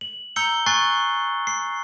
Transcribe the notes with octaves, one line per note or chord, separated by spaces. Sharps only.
F#7
A#5 E6 G6 C#7 G7
G#5 C#6 F#6 A6 C7 G7
C7